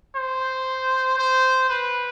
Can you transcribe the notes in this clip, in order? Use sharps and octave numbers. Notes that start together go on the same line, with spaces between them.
C5
C5
B4